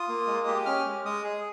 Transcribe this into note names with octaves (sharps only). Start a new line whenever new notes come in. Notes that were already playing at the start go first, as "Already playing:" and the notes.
Already playing: F4 D#6
A#3
G#3
G4
C#4 F6
G#3
G#3 D#6
G#4